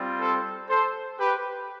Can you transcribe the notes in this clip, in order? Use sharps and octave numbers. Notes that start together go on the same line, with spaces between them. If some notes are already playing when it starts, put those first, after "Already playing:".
Already playing: G3 C4 F4
A4 C5
A4 C5
G4 B4